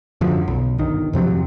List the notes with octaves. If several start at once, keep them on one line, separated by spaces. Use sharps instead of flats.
F#2 D3 F3 F#3
B1
G1 D#3
F2 C3 F3 F#3